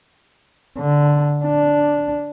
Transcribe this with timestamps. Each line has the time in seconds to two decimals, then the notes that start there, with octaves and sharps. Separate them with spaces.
0.78 D3
1.44 D4